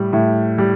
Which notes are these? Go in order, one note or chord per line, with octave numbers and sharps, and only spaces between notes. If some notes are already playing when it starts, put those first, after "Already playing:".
Already playing: A2 G3
A2
G3